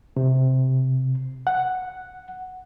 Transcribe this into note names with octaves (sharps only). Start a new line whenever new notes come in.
C3
F#5